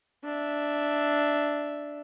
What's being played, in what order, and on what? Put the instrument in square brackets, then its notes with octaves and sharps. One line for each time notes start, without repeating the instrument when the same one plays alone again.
[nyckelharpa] D4 E5